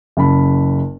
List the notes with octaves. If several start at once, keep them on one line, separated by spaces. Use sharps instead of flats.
F#1 C#3 A5 B5